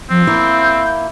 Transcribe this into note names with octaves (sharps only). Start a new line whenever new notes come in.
F3 C4
A#3 E4 G6